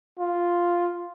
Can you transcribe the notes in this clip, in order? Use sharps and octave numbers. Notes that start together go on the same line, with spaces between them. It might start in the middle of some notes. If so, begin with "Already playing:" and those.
F4